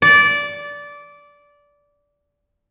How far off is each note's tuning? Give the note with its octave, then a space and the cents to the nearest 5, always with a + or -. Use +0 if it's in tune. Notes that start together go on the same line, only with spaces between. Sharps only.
D5 -15